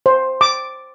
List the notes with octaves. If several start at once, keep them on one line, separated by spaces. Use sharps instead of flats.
C5
D6